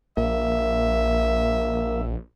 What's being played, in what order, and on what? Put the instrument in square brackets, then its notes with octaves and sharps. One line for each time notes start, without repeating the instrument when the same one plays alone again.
[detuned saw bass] A#1 [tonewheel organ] A#3 [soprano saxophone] E5